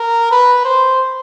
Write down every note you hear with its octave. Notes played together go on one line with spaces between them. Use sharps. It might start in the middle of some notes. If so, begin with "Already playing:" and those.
Already playing: A#4
B4
C5